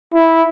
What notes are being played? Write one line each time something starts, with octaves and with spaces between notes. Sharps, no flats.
E4